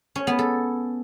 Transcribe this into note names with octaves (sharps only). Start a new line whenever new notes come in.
C#4
B3
A4